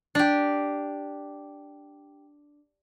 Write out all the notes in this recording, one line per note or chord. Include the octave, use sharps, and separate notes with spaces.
D4 G4